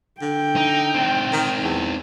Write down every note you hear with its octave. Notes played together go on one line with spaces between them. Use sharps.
D3 G5
D#4
C4 D#4
D#3
E2